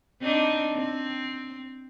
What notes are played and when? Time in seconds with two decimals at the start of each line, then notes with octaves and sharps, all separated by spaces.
0.22 C4 D4 D#4
0.75 C4